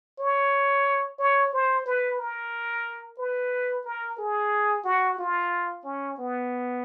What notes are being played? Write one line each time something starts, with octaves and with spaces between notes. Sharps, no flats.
C#5
C#5
C5
B4
A#4
B4
A#4
G#4
F#4
F4
C#4
B3